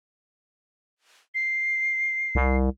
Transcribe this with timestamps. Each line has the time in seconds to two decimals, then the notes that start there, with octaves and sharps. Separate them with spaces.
1.35 C7
2.35 C2